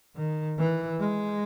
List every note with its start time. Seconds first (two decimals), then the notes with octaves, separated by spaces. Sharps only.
0.16 D#3
0.59 E3
1.00 G#3